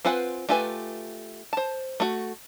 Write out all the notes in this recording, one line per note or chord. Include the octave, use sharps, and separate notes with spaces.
C4 F4 B4 F#5 G#5
A3 F4 G4 B4 G#5
C5 A5
A3 F#4